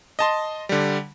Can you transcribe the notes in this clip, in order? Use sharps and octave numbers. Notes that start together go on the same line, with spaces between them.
D#5 A5 C6
D3 G3